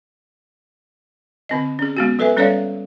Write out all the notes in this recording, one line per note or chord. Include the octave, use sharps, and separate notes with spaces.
D3 C4 D#5
C#4 G#4
G#3 B3 F#4
F#3 A4 B4 E5 G#5
G3 C#4 A4 C#5 D5 F5